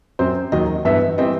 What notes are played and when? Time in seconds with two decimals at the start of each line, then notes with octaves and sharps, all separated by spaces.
0.19 F#2 F#3 C4 C5
0.52 D#2 D#3 F#3 D#5
0.85 G2 E3 B3 E5
1.18 E3 G3 C4 D#5